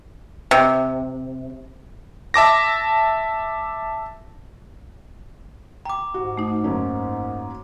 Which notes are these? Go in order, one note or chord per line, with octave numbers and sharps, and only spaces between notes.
C3
E5 A5 D6 A#6
G5 A#5 D6
G#2 F#4
A3 D#4
F#2 A#3 C#4